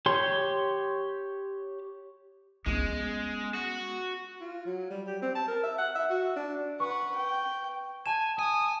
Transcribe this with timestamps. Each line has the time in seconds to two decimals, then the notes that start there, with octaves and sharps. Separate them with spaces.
0.06 G4 C#5 C6
2.66 G#3 B3 C#4
3.54 F#4
4.41 F4
4.65 F#3
4.90 G3
5.06 G4
5.22 C4
5.35 A5
5.48 A#4
5.63 E5
5.78 F#5
5.95 E5
6.10 F#4
6.36 D4
6.80 B4 F#5 C#6
7.16 G5
8.06 G#5 A5 E7
8.39 G#5 D#6